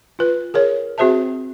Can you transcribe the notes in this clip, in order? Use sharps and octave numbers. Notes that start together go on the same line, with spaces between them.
F4 B4
G#4 A#4 C#5
C4 F#4 G#4 C5 E5 A5